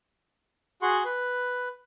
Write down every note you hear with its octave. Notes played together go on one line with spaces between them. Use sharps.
F#4 G#4 F#5 C6 C#6
B4